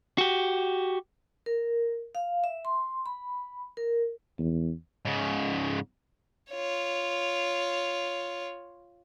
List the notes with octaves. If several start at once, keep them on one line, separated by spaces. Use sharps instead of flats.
F#4 G4
A#4
F5
E5
C6
B5
A#4
E2
G#2 C#3
F4 C#5